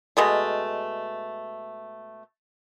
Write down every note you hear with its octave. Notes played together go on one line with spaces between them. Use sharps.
B2 G#3 A3